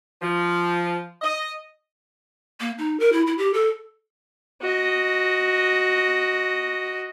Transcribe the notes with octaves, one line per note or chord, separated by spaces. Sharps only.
F3
D#5
A#3
D#4
A#4
E4
E4
G4
A4
F#4 D#5